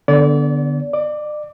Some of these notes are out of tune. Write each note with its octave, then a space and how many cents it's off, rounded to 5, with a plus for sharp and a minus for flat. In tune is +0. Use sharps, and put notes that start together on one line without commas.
D3 +0 B3 -5 D5 -35
D5 +40 D6 +0